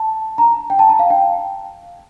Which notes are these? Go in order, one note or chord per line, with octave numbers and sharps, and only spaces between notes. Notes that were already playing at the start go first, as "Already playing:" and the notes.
Already playing: A5
A#5
G5
A5
A5
F5
G5